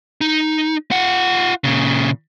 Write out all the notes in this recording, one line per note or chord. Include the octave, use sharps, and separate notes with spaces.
D#4
F4 F#5
A#2 C#3